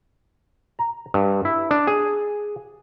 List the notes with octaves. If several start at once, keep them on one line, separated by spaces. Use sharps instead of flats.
A#5
G2
E4
D4
G#4